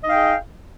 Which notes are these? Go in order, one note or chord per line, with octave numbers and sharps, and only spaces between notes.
D#4 G#4 D#5 F5 G5